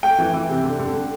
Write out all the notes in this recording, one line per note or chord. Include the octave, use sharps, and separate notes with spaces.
A3 G5
E3
E3
C3
D3
D3
D3